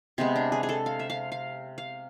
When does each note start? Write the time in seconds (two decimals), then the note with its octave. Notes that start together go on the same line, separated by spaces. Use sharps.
0.18 C3 G#3 B3 C4
0.36 D4
0.52 G#4
0.63 G#4
0.69 A4
0.86 F5
0.99 E5
1.10 F5
1.32 F5
1.78 F5